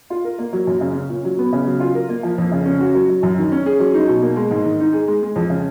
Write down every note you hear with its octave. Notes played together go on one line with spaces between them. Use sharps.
F4
A#4
A#3
F#3
F#2
C#3
C#4
A#2
F#3
B3
C#3
F#3
F4
A#4
A#3
F3
F2
C#3
C#4
F#4
F#3
F#3
F#2
D#3
C#4
G#4
F#3
D#4
B2
A#3
G#3
G#2
D#3
D#4
G#4
G#3
G#3
F2
C#3